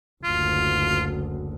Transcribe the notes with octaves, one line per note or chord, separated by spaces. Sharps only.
F#1 D2 F4